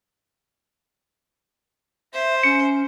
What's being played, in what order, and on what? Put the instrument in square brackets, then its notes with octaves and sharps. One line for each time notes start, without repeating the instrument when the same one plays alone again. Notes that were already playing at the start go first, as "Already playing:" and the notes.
[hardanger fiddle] C5 [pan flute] E5
[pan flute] C#4 [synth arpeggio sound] C#7